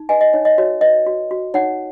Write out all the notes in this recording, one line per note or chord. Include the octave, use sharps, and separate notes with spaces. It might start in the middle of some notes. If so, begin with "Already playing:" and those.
Already playing: D#4
B4 D#5 G#5
D#5
D#4 C#5
D#5
F#4 C#5
B4 D#5
F#4
F#4
D#4 C#5 F#5